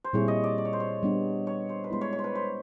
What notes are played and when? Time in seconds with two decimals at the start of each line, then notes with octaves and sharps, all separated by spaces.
0.04 C5
0.13 A#2 G3 C4 E4 G#4 C#5
0.28 D#5
0.44 D5
0.58 D5
0.65 C#5
0.73 C5
0.80 C#5
1.03 G3 B3 D4
1.47 C#5
1.69 C5
1.84 B4
1.90 G#3 B3 E4 C5
2.01 C#5
2.13 C#5
2.19 C5
2.24 B4
2.35 C5